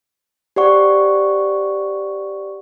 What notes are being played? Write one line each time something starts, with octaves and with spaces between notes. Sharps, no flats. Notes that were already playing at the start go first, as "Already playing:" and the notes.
G4 C5 D5 F#5 C#6